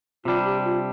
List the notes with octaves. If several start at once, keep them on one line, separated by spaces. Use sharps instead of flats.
C3 G3 D4 F4
G4
F4